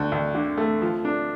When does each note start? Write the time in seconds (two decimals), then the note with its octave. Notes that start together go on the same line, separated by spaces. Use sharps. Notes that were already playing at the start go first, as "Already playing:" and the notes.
Already playing: D2
0.12 D2
0.35 D3
0.58 A3
0.82 F3
1.05 D4